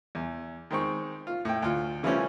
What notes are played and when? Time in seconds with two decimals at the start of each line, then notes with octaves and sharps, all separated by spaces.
0.15 E2
0.71 D#3 G#3 C4 C#6
1.27 F4
1.45 A2 G5
1.62 D2 F4
2.03 C#3 E3 F3 G3 A3 C#4